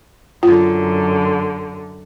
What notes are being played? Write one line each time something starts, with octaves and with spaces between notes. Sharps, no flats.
F#2 D3 F4